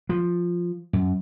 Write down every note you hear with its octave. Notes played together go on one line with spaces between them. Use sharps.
F3
F#2